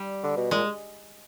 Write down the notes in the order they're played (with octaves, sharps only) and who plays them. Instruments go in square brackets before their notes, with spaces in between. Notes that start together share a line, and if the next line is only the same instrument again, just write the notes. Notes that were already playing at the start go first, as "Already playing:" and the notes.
Already playing: [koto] G3
[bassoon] D3
B2
[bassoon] A#2 [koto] G#3